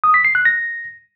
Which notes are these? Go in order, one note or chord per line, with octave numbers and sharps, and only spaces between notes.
D#6
B6
C7
F#6
A#6